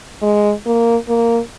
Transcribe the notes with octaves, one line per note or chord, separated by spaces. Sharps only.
G#3
A#3
A#3